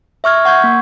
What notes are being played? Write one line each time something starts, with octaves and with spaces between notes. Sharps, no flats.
E5 C#6 F6 G#6
F#5 C#6 G6 G#6
A#3